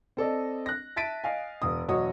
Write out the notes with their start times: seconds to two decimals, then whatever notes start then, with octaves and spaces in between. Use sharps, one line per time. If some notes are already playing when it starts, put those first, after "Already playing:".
0.17 C4 A4 D5 D#5
0.66 F#6 A#6
0.96 E5 A5 A6 B6 D7 D#7
1.24 D#5 F5 G#5
1.62 E1 D#6
1.88 E1 F#3 F#4 C#5 D#5 D#6